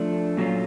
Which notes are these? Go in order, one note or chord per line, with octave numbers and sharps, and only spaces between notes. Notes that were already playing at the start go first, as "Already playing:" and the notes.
Already playing: F3 A3 D4
A#2 F#3 A3 C#4 F4